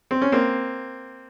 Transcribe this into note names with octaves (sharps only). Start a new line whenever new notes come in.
C4
C#4
A#3 C4